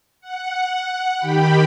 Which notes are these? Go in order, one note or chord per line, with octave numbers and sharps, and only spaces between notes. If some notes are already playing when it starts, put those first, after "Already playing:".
F#5
D#3 G4 G5 B5